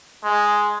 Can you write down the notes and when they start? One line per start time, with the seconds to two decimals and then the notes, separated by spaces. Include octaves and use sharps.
0.24 G#3